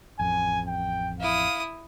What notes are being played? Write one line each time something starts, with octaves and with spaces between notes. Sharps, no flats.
A1 F2 G#5
G5
E4 F5 D#6